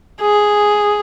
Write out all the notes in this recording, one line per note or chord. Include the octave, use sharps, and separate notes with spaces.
G#4